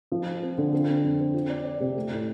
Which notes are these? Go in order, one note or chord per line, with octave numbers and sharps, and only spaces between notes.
F3
F4
C4
D3
C4
C4
F2
C4
F4
D5
D5
C3
A3
A2